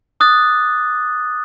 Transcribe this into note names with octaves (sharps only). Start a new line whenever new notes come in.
D6 D#6 F#6 A6